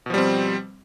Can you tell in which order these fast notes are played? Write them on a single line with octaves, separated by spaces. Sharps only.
B2 F3 G3 C4